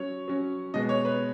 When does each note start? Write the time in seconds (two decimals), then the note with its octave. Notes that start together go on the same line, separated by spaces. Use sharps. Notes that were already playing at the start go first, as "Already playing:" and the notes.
Already playing: F#3 C#4 C#5
0.28 F#3 C#4
0.74 B2 G#3 B3 D#5
0.89 C#5
1.05 B4